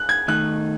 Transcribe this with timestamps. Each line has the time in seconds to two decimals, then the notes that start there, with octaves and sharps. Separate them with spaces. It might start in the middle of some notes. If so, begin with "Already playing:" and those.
Already playing: F#6
0.09 G#6
0.28 D#3 A3 D#4 F#6